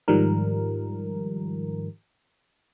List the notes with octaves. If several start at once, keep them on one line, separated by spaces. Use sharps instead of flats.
G#2 D#3 F3 G3 A#4